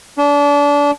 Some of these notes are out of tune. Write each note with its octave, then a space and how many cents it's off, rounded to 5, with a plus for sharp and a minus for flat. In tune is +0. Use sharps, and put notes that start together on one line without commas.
D4 -30